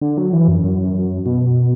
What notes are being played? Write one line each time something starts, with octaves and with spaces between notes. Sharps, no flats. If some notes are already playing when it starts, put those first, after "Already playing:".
D3
F#3
E3
F#2
F#2
B2